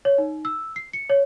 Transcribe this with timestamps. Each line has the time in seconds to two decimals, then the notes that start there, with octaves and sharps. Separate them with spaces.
0.05 C#5
0.18 D#4
0.45 E6
0.76 C7
0.93 C#7
1.10 C#5